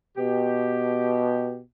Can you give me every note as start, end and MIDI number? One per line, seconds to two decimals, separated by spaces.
0.17 1.59 47
0.17 1.59 67